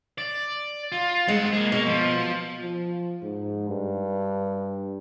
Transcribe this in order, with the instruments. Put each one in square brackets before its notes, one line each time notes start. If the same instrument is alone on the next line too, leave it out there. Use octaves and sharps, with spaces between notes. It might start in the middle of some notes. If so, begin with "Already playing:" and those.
[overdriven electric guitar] D5
F4
[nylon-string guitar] G#3 [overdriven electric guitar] C4 F#5
[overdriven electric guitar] A#3 G#4
[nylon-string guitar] B2 [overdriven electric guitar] A#3
[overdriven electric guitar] F3
[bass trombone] F3
G#2
G2